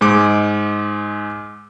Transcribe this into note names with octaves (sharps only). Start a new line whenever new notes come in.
G#2 G#3 D6